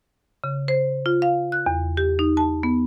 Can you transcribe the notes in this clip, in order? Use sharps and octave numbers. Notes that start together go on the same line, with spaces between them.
C#3
C5
F4
F5
F#6
E2
G4
D#4
A5
B3